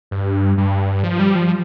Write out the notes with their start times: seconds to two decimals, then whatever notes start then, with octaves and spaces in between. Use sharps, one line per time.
0.11 G2
0.58 G2
1.03 F3
1.19 G3
1.36 F3